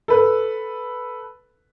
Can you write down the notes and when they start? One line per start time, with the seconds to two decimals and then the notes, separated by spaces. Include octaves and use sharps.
0.08 A4 B4